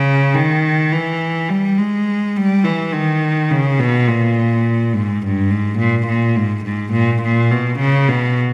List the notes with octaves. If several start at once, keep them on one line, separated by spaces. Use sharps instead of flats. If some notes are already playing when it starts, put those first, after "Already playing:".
Already playing: C#3
D#3
E3
G3
G#3
G3
E3
D#3
C#3
B2
A#2
G#2
G2
G#2
A#2
A#2
G#2
G#2
A#2
A#2
B2
C#3
B2